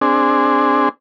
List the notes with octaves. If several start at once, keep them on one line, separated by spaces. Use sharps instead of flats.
C4 D4 G#4